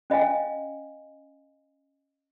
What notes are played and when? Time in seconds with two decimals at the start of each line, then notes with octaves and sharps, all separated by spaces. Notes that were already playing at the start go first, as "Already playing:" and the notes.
0.10 C#4 D#5 F5 G#5